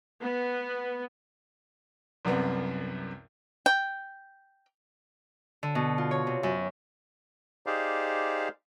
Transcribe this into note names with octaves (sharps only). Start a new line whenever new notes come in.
B3
C2 F#2 C3 B3
G5
D3
B2
F4
C#5
C3
F#2
D#4 G4 G#4 C5 D5 F5